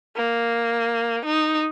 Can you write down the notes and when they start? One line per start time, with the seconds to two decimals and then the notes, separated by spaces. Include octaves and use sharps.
0.16 A#3
1.25 D#4